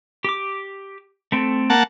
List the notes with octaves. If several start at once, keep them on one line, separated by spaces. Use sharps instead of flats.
G4 D6
A3 C4 A4
A#3 F#5 A5